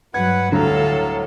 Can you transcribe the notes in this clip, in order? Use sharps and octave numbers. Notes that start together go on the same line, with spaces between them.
G2 F#3 B4 F#5 G#6
D2 A2 D3 F#3 G3 A4 F5 A#5